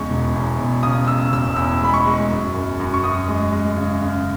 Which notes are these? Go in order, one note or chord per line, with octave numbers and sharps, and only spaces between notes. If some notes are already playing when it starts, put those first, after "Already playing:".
Already playing: E2 C#3 G#3 C#6
E1
E2
E1
C#3 D#6
C#3 E6
E1 E6
E2 E6
G#3 B5
C#6
G#3
F#2
F#2
F#2
C#6
F#2 D#6
G#3
G#3
C#3
C#3